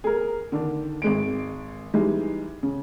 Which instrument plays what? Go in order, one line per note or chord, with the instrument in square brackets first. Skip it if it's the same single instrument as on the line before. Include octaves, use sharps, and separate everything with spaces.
[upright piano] G#4 A#4
D3 D#3 D4
G#1 G#3 D7
E3 G3 G#3 D#4
C#3